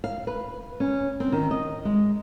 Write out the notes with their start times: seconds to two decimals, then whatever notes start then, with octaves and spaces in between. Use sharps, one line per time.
0.04 F5
0.27 B4
0.80 C#4
1.20 C4
1.32 D#3
1.51 D#5
1.85 G#3